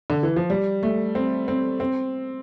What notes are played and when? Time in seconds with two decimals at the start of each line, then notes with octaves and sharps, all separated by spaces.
0.10 D3
0.23 E3
0.36 F3
0.50 G3
0.83 A3
1.15 C4
1.48 C4
1.80 C4